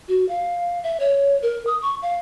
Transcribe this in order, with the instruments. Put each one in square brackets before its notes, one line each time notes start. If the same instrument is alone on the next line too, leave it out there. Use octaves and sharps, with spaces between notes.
[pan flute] F#4
F5
E5
C#5
A#4
D#6
C#6
F5